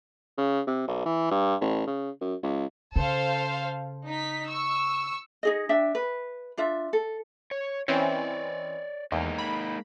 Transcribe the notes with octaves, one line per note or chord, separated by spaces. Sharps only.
C#3
C3
B1
E3
G2
A1
C#3
F#2
C#2
C#3 A4 C5 F5
D#4 B6
C#6 E6
D#4 G#4 D#5
D4 E5 G5
B4
D4 F4 E5
A4
C#5
E3 C4 C#4 C#5 D5
E2 G#3 A#3 D#4
B5